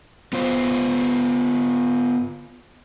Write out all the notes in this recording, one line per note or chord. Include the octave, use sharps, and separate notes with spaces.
B3 F4 C5